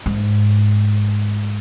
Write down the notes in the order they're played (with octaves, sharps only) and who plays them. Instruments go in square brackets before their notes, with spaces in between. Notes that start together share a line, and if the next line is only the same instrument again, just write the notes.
[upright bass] G#2